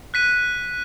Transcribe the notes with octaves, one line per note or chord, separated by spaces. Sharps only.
F#6 B6 D#7